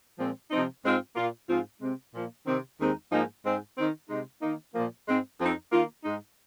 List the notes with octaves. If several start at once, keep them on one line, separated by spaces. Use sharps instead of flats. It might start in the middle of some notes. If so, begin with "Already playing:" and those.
A#2 F3 G#3 C4
C3 F3 C4 D#4
G#2 G#3 C4 F4
A#2 A#3 F4
G#2 F3 C4 F4
C3 G#3 C4
A#2 F3 A#3
C3 D#3 C4
D#2 D#3 G#3 C4 D#4
G#2 F3 A#3 D#4
G#2 G#3 C4
D#3 C4 D#4
C3 G#3 D#4
D#3 A#3 D#4
A#2 F3 A#3
G#2 G#3 C4
F2 F3 C4 D#4
D#3 A#3 F4
G#2 G#3 D#4